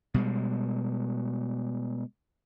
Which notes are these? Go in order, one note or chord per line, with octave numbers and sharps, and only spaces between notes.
B2 G3 G#3